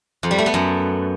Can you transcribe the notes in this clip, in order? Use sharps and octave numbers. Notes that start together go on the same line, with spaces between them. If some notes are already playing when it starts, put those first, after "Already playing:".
F2
G3
A3
B3
F#2